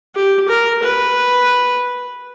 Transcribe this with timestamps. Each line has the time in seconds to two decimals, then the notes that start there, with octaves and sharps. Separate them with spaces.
0.15 G4
0.48 A#4
0.82 B4